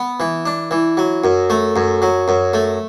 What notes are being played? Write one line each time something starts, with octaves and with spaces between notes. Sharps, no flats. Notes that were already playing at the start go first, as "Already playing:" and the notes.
Already playing: B3
E3
D4
E3
F#3
F#2
A3
F#2
F#3
F#2
A3